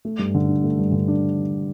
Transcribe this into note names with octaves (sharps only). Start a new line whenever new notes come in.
A3
G2
D3
D4
A3
G2
D3
D4